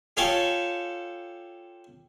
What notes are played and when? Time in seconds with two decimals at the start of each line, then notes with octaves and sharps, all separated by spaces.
0.17 F4 G4 A4 C#5 G#5 A5